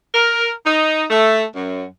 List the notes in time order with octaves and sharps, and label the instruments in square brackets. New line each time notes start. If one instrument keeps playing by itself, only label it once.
[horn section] A#4
D#4
A3
F#2